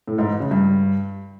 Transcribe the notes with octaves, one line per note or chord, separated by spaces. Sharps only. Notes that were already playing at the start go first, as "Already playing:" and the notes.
A2
G#2
E3
C#3
G2